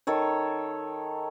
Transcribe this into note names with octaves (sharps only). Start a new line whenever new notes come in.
D#3 A4 C#5